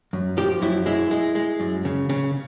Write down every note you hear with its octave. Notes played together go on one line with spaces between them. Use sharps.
F#2
F3 G4
F#2 E4
G#3 E4
G#3
G#3
F#2
C#3
C#3